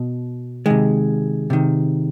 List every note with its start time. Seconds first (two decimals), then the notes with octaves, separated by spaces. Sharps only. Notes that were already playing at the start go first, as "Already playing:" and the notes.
Already playing: B2
0.66 C3 D#3 G#3
1.50 C3 D#3